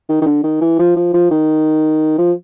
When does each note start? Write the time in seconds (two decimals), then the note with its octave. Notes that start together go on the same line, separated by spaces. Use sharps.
0.09 D#3
0.22 D#3
0.26 D3
0.44 D#3
0.61 E3
0.79 F3
0.96 F3
1.14 F3
1.31 D#3
2.18 F3